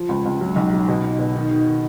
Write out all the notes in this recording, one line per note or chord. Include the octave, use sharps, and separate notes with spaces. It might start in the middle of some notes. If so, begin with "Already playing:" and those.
Already playing: F3
C#2
C#2
F#3
B1
F#3
B2
D#4
B2
D#3
D#3
D#3